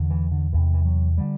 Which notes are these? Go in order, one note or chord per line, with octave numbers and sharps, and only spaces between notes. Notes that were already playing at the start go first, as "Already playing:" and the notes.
Already playing: E2 D3
E3
D3
E2 C3 E3
E3
F#3
D3 G3